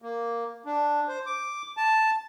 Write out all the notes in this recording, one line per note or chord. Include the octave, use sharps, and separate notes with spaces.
A#3
D4
C5
D6
A5